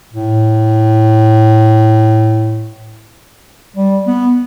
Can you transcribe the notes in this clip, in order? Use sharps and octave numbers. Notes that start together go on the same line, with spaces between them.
A2
G3
B3